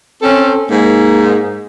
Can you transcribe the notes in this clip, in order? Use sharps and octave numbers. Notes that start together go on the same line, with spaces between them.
C4 C#4 A4
G#2 A#3